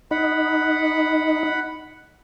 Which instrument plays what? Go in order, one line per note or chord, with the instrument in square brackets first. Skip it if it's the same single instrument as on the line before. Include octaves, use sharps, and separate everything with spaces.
[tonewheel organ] D#4 [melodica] F#5 B5